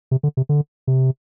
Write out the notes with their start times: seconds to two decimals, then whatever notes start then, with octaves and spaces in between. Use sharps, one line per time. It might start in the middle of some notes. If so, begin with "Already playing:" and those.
0.11 C3
0.23 D3
0.37 C3
0.49 D3
0.87 C3